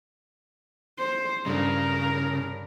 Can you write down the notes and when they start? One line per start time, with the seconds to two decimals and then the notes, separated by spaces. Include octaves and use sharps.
0.99 C5
1.46 G2 C#3 A#4